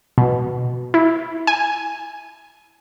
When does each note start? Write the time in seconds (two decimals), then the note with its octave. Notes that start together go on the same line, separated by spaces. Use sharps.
0.18 B2
0.94 E4
1.47 G#5